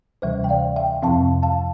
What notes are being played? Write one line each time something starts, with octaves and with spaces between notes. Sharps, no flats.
D2 C3 E3 G3 C5 E5
G5
D5 F5
E5 G5
F2 C3 F3 C4 F5 A5
F5 A5